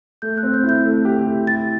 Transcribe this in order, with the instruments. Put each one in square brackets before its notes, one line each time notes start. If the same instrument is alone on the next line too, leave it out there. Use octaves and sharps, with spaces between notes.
[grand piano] A3 [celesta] G6
[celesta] F#6
[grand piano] C4
[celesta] G6
[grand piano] E4
[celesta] G6
[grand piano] A3
G4
E4
[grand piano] E4 [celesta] A6